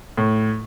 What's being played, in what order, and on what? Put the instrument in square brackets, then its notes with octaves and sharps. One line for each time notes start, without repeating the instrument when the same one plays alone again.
[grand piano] A2